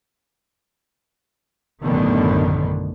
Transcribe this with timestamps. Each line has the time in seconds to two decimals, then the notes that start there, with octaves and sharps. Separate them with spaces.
1.82 A1 F#2 B2 D3 D#3 B3